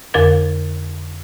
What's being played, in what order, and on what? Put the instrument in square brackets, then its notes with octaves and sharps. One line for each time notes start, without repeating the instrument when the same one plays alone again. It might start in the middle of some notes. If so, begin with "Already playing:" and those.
[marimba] F2 D3 A#4 A6